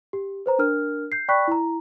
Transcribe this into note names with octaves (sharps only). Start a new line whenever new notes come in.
G4
B4 C5 A#5
D4 A#4 F6
G6 C7
D5 G5 B5 C#6 F#6 B6
E4 A#5